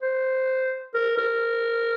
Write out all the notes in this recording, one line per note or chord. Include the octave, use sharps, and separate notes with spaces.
C5
A#4
A#4